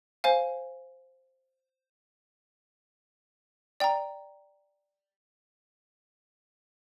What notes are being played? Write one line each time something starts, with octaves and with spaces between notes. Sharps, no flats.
C5 F5 G#5
D5 G5 A#5